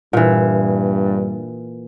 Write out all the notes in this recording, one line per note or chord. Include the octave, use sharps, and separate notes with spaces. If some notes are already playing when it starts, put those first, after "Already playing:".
G2 A#2 E3